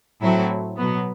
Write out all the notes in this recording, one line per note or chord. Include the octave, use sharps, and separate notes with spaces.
A2 F#3 C4 E4 A4
B2 F#3 B3